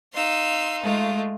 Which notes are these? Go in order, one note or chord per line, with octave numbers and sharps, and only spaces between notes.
D#4 F5 C6 E6
G#3 A3 F4